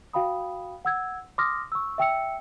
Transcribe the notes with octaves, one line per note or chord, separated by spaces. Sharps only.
F#4 F5 G5 B5 D#6
F#5 E6 G#6
C6 D6 D#6 F6 A#6
C#6 E6
E5 G5 E6 C#7